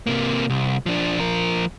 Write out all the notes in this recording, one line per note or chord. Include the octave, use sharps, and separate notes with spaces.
C3 A#3
C2
F3 D4
F3 A#4